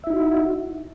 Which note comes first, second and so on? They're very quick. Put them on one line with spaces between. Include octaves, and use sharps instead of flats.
E5 E4 D#4 F#4